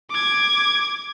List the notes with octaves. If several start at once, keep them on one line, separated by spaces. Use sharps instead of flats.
D6 G#6